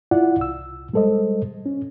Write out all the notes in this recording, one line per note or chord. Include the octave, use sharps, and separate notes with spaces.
E4 F4 D5 F#5
C2 E6
G3 G#3 A4 C5 D#5
C#4